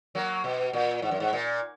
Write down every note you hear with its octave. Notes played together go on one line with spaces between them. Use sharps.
F#3 A#3
B2
A#2
G#2
F#2
G#2
A#2